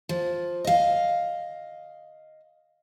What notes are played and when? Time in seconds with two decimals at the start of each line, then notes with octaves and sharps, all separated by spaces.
0.09 F3
0.65 D#5 F5